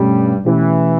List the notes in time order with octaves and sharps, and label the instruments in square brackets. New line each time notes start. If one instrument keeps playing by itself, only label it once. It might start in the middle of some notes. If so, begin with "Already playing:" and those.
Already playing: [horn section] G2 G3 [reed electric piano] B2 A3 C#4 G4
[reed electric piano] B2 A3 C#4 G4 [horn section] E3